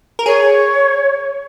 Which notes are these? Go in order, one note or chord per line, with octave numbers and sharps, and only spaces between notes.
A#4
G#4 C#5